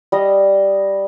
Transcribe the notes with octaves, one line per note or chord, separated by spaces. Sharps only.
G3 D#5 D#6